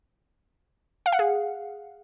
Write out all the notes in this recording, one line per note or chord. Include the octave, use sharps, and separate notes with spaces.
F5
F#5
G#4